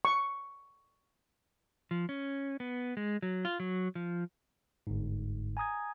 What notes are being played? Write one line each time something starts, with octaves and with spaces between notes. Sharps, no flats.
C#6
F3
C#4
B3
G#3
F#3
F4
F#3
F3
G1 G#2
G#5 A#5 D#6 G#6